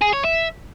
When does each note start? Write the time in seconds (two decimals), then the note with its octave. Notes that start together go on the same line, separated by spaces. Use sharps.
0.02 G#4
0.13 C#5
0.25 E5